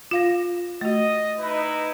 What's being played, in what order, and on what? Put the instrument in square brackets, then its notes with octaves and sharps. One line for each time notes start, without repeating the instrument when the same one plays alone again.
[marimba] F4 F5 A#6
[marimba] A3 F#4 [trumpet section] D#5
[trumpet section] D#4 E4 B4